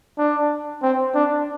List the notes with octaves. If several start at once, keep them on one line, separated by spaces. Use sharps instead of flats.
D4
C4
D4